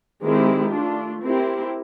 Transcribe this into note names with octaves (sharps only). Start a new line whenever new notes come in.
D#3 G#3 C4 E4 G4
A3 D4 F4
C4 E4 G4 A#4